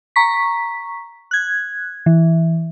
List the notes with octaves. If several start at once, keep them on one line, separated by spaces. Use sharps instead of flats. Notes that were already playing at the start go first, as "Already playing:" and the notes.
A#5 C#6 B6
F#6 G#6
E3